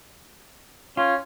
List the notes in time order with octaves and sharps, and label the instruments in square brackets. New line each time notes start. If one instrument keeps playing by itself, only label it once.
[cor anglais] C#4 [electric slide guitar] F4